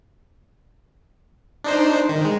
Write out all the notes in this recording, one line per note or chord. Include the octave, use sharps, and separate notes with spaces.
D4 D#4 C5
D#3
G#3